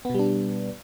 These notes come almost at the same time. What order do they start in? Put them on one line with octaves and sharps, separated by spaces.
B3 B2 G3 D4